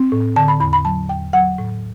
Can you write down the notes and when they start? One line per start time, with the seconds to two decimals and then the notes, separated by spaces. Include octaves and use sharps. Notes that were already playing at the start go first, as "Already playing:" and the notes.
Already playing: C4
0.12 A2
0.36 D3 A5
0.48 B5
0.60 E2 B5
0.73 B5
0.85 F#3 A5
1.09 E2 G5
1.33 F#3 F#5
1.58 A2